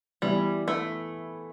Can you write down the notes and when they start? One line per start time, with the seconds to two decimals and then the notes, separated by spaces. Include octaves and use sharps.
0.22 E3 G3 B3 E4
0.68 A3